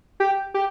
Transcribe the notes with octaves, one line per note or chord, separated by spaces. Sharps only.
G4
G4